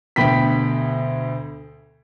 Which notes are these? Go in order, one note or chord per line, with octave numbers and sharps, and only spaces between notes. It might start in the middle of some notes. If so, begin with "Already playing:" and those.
D2 B2 G5 B5 B6